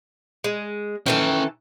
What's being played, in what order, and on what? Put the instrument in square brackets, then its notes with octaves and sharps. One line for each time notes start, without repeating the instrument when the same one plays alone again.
[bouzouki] G#3
[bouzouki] D#3 E3 A4 [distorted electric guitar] C#4 G5